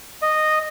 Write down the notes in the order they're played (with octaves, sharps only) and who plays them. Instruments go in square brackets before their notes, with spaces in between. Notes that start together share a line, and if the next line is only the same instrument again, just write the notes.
[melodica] D#5